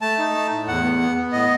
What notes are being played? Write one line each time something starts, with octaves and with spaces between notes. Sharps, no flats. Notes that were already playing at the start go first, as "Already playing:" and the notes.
A3 A5
D#4
A3
A2
E2 F#5
B3
B3
B3
A2 D#5